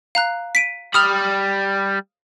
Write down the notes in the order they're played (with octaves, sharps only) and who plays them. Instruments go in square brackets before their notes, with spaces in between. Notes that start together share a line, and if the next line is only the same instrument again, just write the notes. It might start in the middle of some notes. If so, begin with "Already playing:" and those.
[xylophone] F5 A#5 F#6
B6 D7 D#7
[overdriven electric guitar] G3 B5 [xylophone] D#6 F6 F7